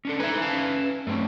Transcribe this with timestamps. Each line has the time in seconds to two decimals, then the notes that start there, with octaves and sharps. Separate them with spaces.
0.05 C#4 D4 A4
0.20 D#4 B4 E5 G#5
0.42 C#4 F5 A5
1.07 G2 A3 C4 C#4